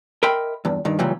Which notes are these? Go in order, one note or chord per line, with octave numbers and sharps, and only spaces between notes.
A#4 D#5 E5 G5 B5 C6
E2 G2
G2 D#3
C#2 A#2 E3 F#3 G3